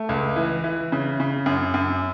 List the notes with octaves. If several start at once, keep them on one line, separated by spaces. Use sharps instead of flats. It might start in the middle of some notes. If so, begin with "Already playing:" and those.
Already playing: A3
C#2
E3
E3
C#3
C#3
F#2
F#2